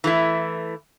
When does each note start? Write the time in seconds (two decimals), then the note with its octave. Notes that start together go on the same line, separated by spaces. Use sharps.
0.04 E3 A3 E4